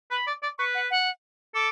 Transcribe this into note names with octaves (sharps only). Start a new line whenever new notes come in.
B4 B5
D5
D5
B4 C#6
F#5
F#5
A4 D6